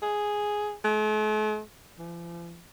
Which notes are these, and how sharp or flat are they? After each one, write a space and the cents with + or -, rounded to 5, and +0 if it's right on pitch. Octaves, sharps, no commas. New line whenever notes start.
G#4 +0
A3 -45
F3 -45